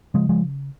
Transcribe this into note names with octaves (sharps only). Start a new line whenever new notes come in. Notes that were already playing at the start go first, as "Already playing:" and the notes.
C#3 F3 G#3
F3 G#3